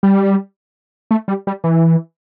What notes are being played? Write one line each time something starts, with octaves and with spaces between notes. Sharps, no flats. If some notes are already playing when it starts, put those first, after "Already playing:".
G3
A3
G3
G3
E3